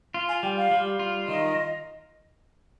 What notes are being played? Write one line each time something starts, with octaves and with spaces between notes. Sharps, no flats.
F4
G#5
G3 G5
F5
G3
F4
D#3 D#5